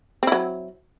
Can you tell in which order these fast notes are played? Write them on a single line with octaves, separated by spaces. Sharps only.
C4 E4 F#3